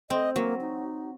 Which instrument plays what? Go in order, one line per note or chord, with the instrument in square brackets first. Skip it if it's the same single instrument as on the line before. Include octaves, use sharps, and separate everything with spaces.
[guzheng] C4 [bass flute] D#5
[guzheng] F#3 [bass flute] A#3
[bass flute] D#4